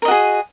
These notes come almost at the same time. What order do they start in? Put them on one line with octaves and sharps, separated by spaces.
A#4 D#5 F#4 G#4